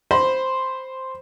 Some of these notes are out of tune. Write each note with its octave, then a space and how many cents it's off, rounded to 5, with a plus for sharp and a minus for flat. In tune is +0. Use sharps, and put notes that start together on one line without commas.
C5 +0 B5 +5